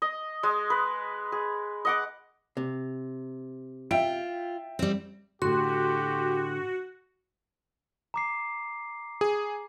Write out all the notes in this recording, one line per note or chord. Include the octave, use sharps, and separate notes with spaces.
D#5
G#3
B4
G#4
D#5 F#5 D6
C3
F4 E5 G5 D7
G3 C4
A2 D3 F#4 G4 C6
A#5 D6 C7
G#4